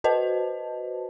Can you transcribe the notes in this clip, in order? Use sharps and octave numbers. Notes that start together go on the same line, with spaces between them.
F#4 B4 C5 D#5 A5